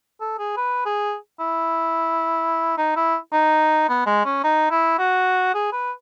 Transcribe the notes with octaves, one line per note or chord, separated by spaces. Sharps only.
A4
G#4
B4
G#4
E4
D#4
E4
D#4
B3
G#3
C#4
D#4
E4
F#4
G#4
B4